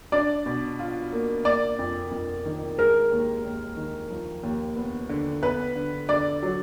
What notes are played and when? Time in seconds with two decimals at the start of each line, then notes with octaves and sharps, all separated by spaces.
0.12 D4 D5
0.46 B2
0.79 F4
1.13 A#3
1.45 A#3 D5
1.79 F2
2.11 F2
2.45 D#3
2.79 G#3 A#4
3.12 D#2
3.44 D#2
3.77 D#3
4.10 F3
4.43 D#2
4.76 B3
5.09 D3
5.43 B3 B4
5.76 D3
6.09 D3 D5
6.43 F#3